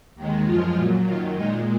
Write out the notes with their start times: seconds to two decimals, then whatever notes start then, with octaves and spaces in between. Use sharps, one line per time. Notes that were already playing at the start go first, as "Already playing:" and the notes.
0.15 D#2 D#3 G#3
0.45 F#2 F3 G#3 F4
0.75 A#2 F#3
1.05 F#2 D#3 F#3 F4
1.36 A#2 G#3 D#4